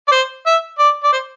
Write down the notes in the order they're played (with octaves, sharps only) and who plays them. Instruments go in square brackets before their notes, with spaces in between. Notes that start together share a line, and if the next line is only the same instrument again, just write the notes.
[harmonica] D5
C5
E5
D5
D5
C5